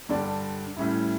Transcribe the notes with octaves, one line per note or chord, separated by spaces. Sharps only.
G2 D3 G3 D4 D5
A2 G3 C#4 E4